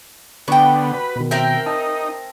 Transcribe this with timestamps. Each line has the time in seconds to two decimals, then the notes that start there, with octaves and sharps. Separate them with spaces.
0.48 D3 B3 F#4 G5
0.94 B4
1.16 B2 D#3
1.31 C4 A#4 E5 G5
1.66 D#4 A5